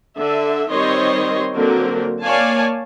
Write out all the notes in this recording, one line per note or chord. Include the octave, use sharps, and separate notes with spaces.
D3 E5
D#3 G3 C4 C#5 D#5 C6
D3 F#3 A#3 C4 A#4
A#3 C#5 D5 F5 G#5 A5